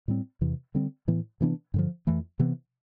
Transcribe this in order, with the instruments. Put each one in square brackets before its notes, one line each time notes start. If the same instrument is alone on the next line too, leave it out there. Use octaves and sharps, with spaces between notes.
[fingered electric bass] A2 G3 C4
E2 C3 E3
D3 G3 C4
A2 E3 B3
C3 E3 B3 D4
G2 D3 F3
F2 E3 A3
C3 E3 B3